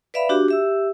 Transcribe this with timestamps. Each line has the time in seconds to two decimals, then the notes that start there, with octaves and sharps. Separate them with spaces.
0.14 B4 D5 E5 F5 B5
0.29 D4 F#4 G4
0.48 G4 E5 E6